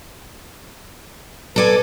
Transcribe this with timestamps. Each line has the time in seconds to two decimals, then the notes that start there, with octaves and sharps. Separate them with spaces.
1.56 A4 B4 D5 G#5